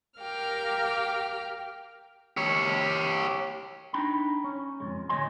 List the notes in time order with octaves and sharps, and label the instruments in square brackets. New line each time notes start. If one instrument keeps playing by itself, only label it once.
[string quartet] G4 A#4 F5 G5 F6
[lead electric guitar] G4 C#5
[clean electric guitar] D4 D#4 G5 A#5 B5
C#4
F2 B2 G#3
D2 A2 C#5 D#5 G#5 C6